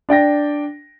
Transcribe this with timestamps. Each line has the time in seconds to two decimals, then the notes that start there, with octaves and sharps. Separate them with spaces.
0.09 D4 D5 G5 A#6